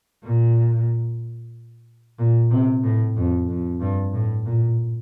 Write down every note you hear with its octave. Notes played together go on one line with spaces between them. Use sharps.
A#2
A#2
C3
A2
F2
F2
G2
A2
A#2